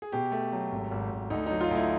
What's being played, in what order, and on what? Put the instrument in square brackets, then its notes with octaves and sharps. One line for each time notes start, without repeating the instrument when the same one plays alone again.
[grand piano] G#4
B2 G4
A3
F#3
G#1
G#1
G#1
D2 D#4
F#3 D#4
F4
D2 E4